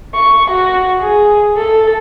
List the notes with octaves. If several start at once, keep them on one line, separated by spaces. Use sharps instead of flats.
C#6
F#4
G#4
A4